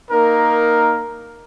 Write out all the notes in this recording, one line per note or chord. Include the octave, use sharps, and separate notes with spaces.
A#3 D#4 A#4